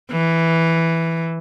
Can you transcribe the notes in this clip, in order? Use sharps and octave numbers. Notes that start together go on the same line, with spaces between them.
E3